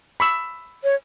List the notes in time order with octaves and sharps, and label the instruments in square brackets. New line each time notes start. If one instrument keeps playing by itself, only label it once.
[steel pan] B5 C#6 E6
[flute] C#5